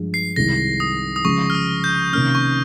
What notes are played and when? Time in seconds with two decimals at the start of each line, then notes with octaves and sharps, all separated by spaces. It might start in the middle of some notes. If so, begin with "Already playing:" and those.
Already playing: G2 F3 G#3
0.14 C7
0.36 C2 C3 D#3 G#3 A#6
0.80 D#6
1.16 D#6
1.24 C#3 F3 G#3 C#6
1.50 F6
1.55 D#6
1.84 G6
2.12 C3 D#3 A#3 C#4 F6
2.35 C#6